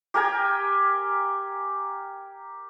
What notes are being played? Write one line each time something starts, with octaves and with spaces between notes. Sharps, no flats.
G4 A#4 G5 G#5